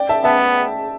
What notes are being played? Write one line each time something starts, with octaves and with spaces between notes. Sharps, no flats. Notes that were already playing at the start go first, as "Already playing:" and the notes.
Already playing: D5 G5
E5 A5
B3 E5 A5